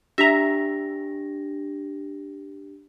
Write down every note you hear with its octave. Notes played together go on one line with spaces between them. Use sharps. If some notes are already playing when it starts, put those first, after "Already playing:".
D4 G4 E5 A#5 A#6